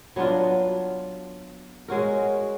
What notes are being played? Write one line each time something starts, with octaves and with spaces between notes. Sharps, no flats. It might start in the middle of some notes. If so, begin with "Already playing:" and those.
F#3 B3 D4 F4
G#3 C#4 F#4 A#4